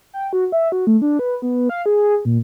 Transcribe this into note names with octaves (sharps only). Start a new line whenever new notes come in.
G5
F#4
E5
F#4
A3
D4
B4
B3
F5
G#4
A#2